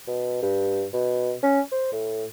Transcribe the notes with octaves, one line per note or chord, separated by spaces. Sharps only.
B2
G2
B2
C#4
C5
A2